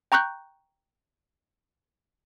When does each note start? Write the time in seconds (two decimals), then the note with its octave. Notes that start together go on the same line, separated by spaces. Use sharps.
0.12 G5 A#5 C#6 F#6 G6